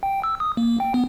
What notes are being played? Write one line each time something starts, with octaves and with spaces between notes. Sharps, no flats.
G5
E6
D#6
A#3
G5
B3